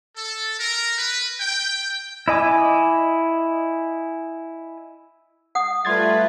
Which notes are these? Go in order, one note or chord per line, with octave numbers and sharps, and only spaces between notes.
A4
A#4
B4
G5
E4 D#5 G#5 D6
F#5 D#6
G3 A3 F4 B4 C6 G#6 A6